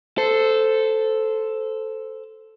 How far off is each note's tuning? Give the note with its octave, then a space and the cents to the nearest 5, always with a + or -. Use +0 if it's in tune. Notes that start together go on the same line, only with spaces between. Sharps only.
A4 +0 C5 -10